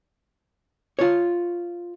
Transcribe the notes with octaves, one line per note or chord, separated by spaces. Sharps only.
F4 C#5